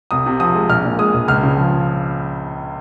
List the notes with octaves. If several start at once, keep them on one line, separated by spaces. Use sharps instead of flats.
C2 D#6
C3
F3 D#6
G#3
A#1 F6
A#2
G#3 D#6
A#1
C#2 F6
C#3
F3